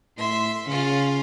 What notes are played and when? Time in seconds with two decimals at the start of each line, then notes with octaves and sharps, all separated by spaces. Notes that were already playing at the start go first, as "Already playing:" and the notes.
0.18 A2 E5 C6
0.67 C#3 C#4 F4 F5